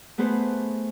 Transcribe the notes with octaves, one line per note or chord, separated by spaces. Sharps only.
A3 B3 G#4 B4 C5